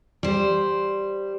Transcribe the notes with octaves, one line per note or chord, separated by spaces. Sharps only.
G3 C5